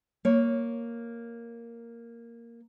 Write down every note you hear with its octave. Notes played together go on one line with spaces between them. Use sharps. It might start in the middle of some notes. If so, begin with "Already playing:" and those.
A#3 C#5